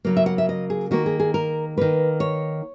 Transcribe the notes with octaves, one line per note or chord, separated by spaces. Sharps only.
C#3 F#3 A#3
E5
F#5
E5
D#5
G#4
D#3 A#3 F#4
G#4
G#4
A#4
D#3 A#3 B4
C#5